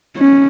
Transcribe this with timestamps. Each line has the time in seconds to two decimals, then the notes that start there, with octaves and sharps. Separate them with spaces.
0.18 C#4